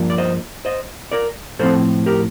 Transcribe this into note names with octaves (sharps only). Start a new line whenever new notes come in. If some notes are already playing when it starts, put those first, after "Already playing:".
Already playing: G2 F3 A#3 D4
D5
C5 D#5
C5 D#5
A#4 D5
A2 F3 C4 A4 C5
G4 A#4